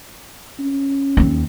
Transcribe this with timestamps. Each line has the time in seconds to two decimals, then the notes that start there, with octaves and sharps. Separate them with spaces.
0.59 C#4
1.17 D#2 C4